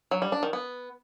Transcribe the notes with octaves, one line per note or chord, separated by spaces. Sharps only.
F#3
G3
D4
D#3
B3